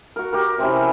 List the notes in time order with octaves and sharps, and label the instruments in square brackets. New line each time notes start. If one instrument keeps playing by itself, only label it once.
[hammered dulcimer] F#4 A#4
G4 A#4
C3 C4 C#4 E4
C#4